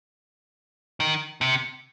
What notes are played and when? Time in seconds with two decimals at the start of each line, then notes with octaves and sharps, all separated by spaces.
1.00 D#3
1.41 C3